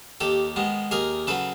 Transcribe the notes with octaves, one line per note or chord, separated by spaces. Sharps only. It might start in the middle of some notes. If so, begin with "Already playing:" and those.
D#2 G4 A4
D#3 G#3 B3
D#2 G#4 A#4
C#3 F#3 A4 B4